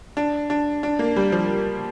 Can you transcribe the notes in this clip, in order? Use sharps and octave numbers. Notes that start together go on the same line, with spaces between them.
D4
D4
D4
A#3
G3
F3